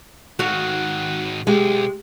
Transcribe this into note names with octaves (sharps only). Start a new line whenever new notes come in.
G#2 D#3 F#4 F5
B1 G#3 G4